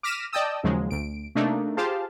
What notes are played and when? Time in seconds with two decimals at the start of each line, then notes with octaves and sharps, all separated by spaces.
0.03 D6 F6 A#6 B6 D#7 E7
0.33 D5 D#5 G5 A5 D#6 E6
0.63 D#2 C#3 F3 F#3 G#3
0.91 D2 D7
1.35 C3 A3 A#3 D4 D#4
1.77 F4 G4 G#4 C5 F5 A5